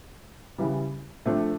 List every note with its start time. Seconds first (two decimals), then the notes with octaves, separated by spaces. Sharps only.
0.58 C#3 E3 G3
1.25 C3 F3 A3 D4 G4